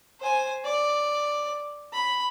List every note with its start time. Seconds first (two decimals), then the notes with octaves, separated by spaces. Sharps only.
0.21 C5 G#5
0.65 D5
1.92 B5